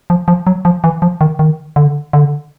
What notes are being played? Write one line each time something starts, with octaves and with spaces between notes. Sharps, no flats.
F3
F3
F#3
F3
E3
F3
D#3
D#3
D3
D3